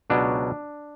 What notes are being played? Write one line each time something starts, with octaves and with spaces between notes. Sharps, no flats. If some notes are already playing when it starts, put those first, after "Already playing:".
C#2 B2 F#3 D4